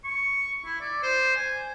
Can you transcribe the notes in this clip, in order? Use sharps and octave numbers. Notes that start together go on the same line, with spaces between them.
C#6
E4
D5
C5
G#5